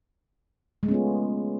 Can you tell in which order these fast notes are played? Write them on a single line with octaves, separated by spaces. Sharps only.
G#3 A3 C#4 B3 F4